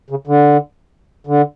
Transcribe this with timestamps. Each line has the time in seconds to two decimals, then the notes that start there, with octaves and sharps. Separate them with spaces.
0.10 C#3
0.27 D3
1.27 D3